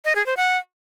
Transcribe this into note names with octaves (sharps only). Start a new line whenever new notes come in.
D#5
G#4
C5
F#5